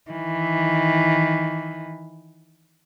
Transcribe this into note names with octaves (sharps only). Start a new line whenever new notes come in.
D#3 E3